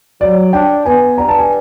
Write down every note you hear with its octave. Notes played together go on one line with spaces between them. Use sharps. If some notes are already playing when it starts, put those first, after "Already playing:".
F#3 D5
D4 G5
B3 G#5
G2 A#5
A5
G#5